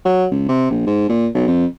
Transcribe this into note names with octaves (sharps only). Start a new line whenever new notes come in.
F#3
C#2
C3
A#1
G#2
A#2
B1
F2